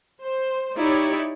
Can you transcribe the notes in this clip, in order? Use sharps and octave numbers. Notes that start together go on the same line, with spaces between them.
C5
D#4 E4 G4 C#5 D5